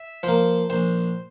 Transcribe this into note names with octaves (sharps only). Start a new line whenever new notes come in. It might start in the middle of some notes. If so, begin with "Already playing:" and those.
Already playing: E5
F3 A#3 C5
A#1 C5